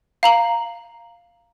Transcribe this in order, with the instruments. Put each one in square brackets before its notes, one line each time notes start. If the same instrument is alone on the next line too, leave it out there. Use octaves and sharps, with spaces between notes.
[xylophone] F5 A#5 F#7